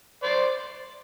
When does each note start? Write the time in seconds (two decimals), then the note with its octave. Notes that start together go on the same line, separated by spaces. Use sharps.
0.23 C5 D5